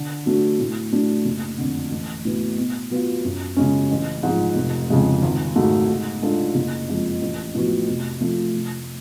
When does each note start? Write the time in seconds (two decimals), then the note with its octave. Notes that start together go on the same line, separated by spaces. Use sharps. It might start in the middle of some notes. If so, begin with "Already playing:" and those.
Already playing: D3
0.26 F#3 A3 D4 F#4
0.60 A2
0.92 F#3 A3 D4
1.25 F#1
1.58 F2 D3
1.91 A1
2.25 A2 F#3 B3
2.58 B2
2.91 F#3 B3 F4
3.25 F#2
3.57 C#3 G#3 C#4
3.91 A1
4.23 G#2 F3 G#3
4.56 F1
4.90 F2 C#3 F3 G#3
5.22 G#1
5.56 G#2 F#3 A3
5.88 G#2
6.22 G#3 D4 F4 A4
6.55 F#1
6.88 F2 F3 G#3
7.21 A1
7.55 A2 F3 B3 F#4
7.87 F1
8.20 F2 F3 A3 F4
8.54 F1